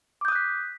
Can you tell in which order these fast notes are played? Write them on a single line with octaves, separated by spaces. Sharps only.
D6 G6 D#6 F#6 B6